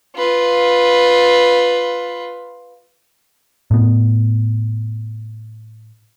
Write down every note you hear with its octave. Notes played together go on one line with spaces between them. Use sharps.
F4 B4
A2 B3